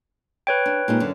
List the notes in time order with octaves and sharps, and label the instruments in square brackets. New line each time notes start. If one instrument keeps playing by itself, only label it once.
[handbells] B4 C#5 G5
[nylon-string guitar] D4
A#2 G#3 D#4
F#2 D3